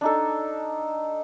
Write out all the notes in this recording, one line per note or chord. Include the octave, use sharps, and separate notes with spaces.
D4 D#4 A4